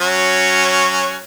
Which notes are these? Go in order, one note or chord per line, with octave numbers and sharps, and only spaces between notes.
F#3 C#4 F#4